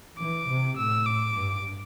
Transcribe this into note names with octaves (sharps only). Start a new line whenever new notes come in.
E3 D6
C3
A2 E6
D6
G2